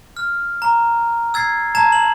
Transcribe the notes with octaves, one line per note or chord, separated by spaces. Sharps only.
F6
A#5
E6 G#6 A6 C7
A5 A#5 G#6 E7
F#7